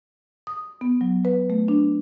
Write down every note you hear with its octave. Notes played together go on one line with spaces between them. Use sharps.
D#6
B3
F#3
B4
A3
D4